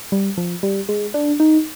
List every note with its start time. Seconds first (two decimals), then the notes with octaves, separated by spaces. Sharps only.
0.12 G3
0.38 F3
0.63 G3
0.89 G#3
1.14 D4
1.40 D#4